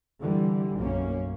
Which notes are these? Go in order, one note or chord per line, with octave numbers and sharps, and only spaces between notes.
D3 E3 G3
B1 F#2 A#3 C#4